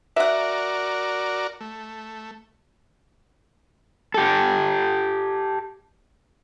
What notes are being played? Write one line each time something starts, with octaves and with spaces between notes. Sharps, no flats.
F#4 A#4 D5 E5 F#5
A3
G4 A4